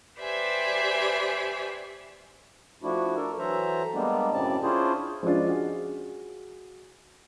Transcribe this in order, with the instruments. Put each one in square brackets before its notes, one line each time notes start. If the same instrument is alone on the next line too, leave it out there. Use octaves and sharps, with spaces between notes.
[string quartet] G4 B4 C5 D5 E5 G#5
[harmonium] F3 A3 D4 E4 F#4
D4 A4 A#4
E3 F#3 A4 C5 E5 A#5
G3 G#3 A#3 B3 D4
F#2 A2 C#3 C4 D5 A5
C#4 D4 E4 F4 G#4 C5
[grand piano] F3 G#3 C#4 D4 F4
F#4 G#4